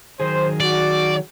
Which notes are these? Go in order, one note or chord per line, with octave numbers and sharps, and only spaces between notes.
D#3 F#3 G#4 C5
F#4 D5